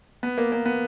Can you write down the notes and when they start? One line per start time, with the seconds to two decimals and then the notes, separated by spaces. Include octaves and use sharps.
0.23 B3
0.38 A#3
0.52 A#3
0.65 B3